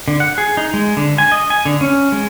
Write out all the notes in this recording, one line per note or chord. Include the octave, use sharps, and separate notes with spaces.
D3
F#5
G#4
D#4
G#3
D3
G#5
D#5
G#5
D3
C#4
G#3